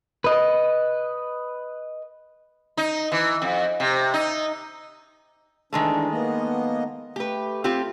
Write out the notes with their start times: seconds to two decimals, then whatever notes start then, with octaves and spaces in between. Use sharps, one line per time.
0.24 B4 D#5
2.77 D#4
3.12 E3
3.42 F2
3.80 C3
4.14 D#4
5.73 D#3 E3 G#3 A3 D4
6.11 A#3 B3 D#5
7.16 A3 G4 B4
7.64 C4 F4 G4